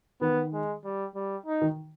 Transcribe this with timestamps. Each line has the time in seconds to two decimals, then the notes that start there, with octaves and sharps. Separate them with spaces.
0.21 D#3 B3
0.53 G#3
0.84 G3
1.15 G3
1.46 D#4
1.62 D#3